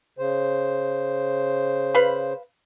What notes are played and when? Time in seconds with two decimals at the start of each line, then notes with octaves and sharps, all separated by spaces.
0.18 C#3 C5
1.95 B4 F5 B5